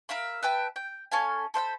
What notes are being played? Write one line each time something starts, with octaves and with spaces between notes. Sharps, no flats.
A#4 E5 F5 B5
B4 E5 G5 A5
G5
C#4 A4 F5 G#5
A4 C5 F5 B5